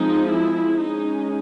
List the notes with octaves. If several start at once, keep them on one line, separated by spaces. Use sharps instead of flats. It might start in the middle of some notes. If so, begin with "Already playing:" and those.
Already playing: F3 G#3 C4 D#4
E4
G#3 C#4 D#4